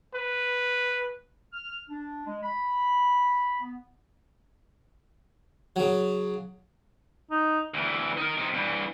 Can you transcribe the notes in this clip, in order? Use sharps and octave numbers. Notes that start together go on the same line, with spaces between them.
B4
F6
D4
G#3
B5
B3
C#3 F#3
D#4
D2 E3
D#4 A#4
C3 D#4
G2 E3